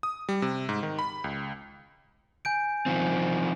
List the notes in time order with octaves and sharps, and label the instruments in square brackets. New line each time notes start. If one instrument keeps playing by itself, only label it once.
[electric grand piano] D#6
G3
C3
G#2
D#3
B5
C#2
[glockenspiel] G#5 G6 D7
[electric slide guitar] D#3 F3 C4